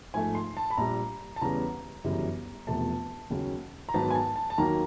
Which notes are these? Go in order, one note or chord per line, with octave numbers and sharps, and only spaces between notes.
G#2 F3 A3 G#5
C6
A5
B5
A#1 A#2 G3 A#5
A5
E2 C#3 E3 G3 B3 A#5
G1 F#2 C#3 E3 G3
E1 E2 C3 F3 A3 A5
D#2 C#3 F#3
A#5
G#2 D#3 F#3 B3 A5
G#5
A5
A5
A5
D#2 D#3 F#3 A#3 A#5